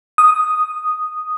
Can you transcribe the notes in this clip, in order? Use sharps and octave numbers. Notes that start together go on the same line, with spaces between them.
D#6